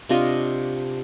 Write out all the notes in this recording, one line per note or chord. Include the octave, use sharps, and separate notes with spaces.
C3 D4 F4 D#5